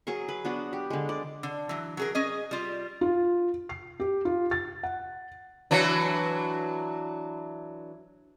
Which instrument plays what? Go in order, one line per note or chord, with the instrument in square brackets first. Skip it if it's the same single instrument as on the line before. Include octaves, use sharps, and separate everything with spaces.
[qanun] F#3 G#4 A#4 C#6
B4
B3 D4 F#4
G4
D3 G#3
D5
[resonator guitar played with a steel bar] D3
E3 F#3
F#3 G#4 A#4
C#4 G#4 D#5
G3 F4
[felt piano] F4
C7
G4
F4
A6
F#5
[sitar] E3 F#3 D4